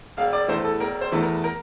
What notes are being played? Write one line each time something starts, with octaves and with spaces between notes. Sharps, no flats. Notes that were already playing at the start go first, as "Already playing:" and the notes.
E1 F5
D5
E2 E3 A3 C5
A4
E1 A#4
C5
E2 E3 A3
A#4
A#4